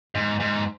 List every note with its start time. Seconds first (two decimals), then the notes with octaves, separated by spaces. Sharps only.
0.15 G#2
0.40 G#2